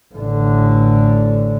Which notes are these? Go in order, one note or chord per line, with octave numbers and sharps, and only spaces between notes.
A1 D3